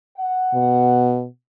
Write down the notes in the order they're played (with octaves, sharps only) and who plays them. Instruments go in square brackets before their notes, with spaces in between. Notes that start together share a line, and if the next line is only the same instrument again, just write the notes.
[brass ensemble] F#5
[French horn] B2